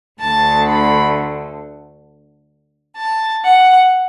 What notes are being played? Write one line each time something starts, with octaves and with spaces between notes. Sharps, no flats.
D2 D3 A3 A5
B5
A5
F#5